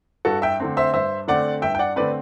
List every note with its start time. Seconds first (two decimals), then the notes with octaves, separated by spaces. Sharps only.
0.25 G2 F#4 A4
0.42 E5 G5
0.60 D3 A3 C4
0.77 C5 E5
0.93 G2 C5 E5
1.28 D3 A3 C4 D5 F#5
1.62 G2 E5 G5
1.75 G5
1.79 D5 F#5
1.96 D3 A3 C4 B4 D5